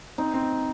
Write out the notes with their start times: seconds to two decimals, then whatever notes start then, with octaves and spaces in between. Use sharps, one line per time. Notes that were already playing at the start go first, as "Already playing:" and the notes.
0.18 C4 D#4
0.34 C4